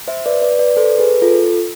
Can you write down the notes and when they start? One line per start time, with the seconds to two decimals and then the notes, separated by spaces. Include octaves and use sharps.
0.08 C5 E5
0.26 B4 D5
0.42 B4 D5
0.59 B4 D5
0.77 A4 C5
0.98 G#4 B4
1.21 F4 A4